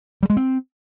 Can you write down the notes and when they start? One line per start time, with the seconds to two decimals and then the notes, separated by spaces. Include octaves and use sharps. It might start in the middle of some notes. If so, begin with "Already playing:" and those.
0.23 G3
0.30 G#3
0.37 C4